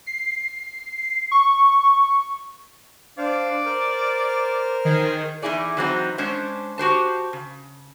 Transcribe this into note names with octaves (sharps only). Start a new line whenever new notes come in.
C7
C#6
D4 C5 D5 F5
A#4 C5 F6
D#3 G#4
E2 D#4 E4 G#4 D5
E3 F#3 C4 D#4
G#3 C#4 D4 C5 C#5
F#4 G4 C5 A5
C#3